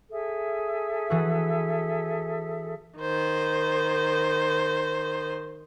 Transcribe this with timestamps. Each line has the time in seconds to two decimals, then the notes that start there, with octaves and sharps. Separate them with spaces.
0.10 G#4 A4 E5
1.10 E3 F#4
2.99 D#3 C5